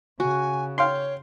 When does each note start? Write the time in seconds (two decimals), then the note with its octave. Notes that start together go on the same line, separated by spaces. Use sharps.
0.20 C#3 F#4 G#5
0.78 C#5 F5 G5 C6